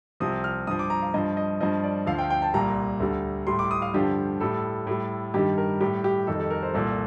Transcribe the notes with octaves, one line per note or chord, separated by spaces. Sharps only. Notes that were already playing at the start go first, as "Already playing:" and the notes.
C2 C3 F3 D#6
F6
G2 F3 D#6
D6
A#5
F5
G2 F3 D#5
D#5
G2 F3 D#5
D5
D2 D3 F3 F5
G5
G5
A5
C2 A#2 G3 A#5
D2 D3 G3
A2 G3 C6
D6
D#6
F5
G2 D3 F3 G4
A2 G3 A4
A2 G3
G2 D#3 G3 G4
A#4
A2 G3 G4
G4
F2 D#3 G3 A4
A4
A#4
C5
C2 A#2 F3 A4